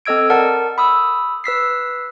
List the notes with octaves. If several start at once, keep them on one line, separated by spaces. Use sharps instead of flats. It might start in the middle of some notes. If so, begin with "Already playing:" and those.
C4 A4 D#5 E6 G#6 D7
A#4 D5 F#5 A5
B5 D#6 E6
B4 E6 B6 C7